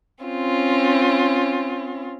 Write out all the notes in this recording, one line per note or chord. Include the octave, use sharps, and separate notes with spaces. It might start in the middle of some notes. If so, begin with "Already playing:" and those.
C4 C#4 F4